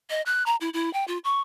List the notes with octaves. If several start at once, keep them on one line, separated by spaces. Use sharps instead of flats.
D#5
F#6
A#5
E4
E4
G5
F4
C#6